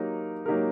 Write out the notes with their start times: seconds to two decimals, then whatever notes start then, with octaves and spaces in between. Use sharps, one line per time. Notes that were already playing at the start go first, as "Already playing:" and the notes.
Already playing: F#3 A#3 D#4 G4 A#4
0.46 F#3 A#3 D#4 G4 A#4